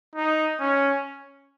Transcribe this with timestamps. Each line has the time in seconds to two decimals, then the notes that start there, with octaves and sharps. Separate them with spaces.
0.16 D#4
0.60 C#4